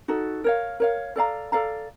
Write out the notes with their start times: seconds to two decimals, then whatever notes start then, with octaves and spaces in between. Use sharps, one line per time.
0.08 D#4 F#4 A4
0.44 A#4 C#5 F5
0.80 A#4 C#5 F5
1.16 A4 D5 F5 A#5
1.52 A4 D5 F5 A#5